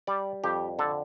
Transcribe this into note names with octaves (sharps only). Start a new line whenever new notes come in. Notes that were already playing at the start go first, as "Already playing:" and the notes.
G3 D5
F2 G4
D3 A4